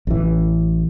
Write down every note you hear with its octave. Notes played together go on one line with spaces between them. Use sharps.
A1 E3